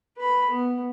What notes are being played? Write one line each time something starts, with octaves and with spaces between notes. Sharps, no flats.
B4 B5
B3